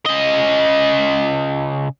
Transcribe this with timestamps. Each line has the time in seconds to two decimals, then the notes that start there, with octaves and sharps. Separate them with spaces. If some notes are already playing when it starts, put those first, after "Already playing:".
0.06 C#3 D#5